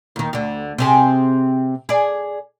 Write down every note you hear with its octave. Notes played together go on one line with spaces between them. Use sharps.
D#2 D#3
D2 D3
C3 C4 G#4
G#4 D5